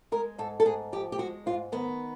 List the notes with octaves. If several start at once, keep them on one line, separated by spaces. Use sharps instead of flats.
G#3 A#4
G#2 A4
A4
G#2 G#4
F3 G4
G4
G#3 F#4
G#2 F4
D#3 B3